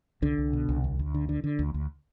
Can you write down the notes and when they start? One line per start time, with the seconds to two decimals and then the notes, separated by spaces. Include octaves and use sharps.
0.22 C2 D3
0.38 C2
0.53 B2
0.69 C2
0.84 D2
0.99 D2
1.14 D3
1.29 D3
1.44 D3
1.59 D2
1.74 D2